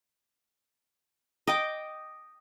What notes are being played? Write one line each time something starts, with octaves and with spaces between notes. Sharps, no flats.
D#5 G5 D6